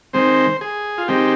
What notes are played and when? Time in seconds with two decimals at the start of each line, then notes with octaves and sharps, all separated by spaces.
0.13 D#3 G#3 C4 C5
0.61 G#4
0.98 F4
1.08 D#3 G#3 C4 G4